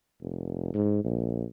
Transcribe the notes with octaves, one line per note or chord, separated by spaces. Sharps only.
F1
G#2
A#1